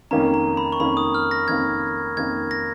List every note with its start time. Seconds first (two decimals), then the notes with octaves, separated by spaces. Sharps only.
0.11 F2 D#3 A#3 C#4 A#5
0.34 A#5
0.57 B5
0.72 C#6
0.79 F2 D#3 A#3 C#4 B5
0.97 D#6
1.15 F6
1.31 A#6
1.48 F2 D#3 A#3 C#4 G#6
2.17 F2 D#3 A#3 C#4 G#6
2.51 A#6